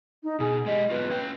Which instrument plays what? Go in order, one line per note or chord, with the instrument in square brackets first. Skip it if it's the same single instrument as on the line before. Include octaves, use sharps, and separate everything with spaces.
[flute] D#4
[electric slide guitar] B2 [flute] G#4
[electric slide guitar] G#3 G4 [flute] D#5
[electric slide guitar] F#3 B3 F4 [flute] B4
[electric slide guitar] C#4 G5